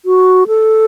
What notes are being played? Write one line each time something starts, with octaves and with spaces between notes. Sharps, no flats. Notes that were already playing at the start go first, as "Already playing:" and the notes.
F#4
A4